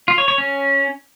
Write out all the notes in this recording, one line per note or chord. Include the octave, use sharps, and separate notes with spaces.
F4
C#5
C#5
C#4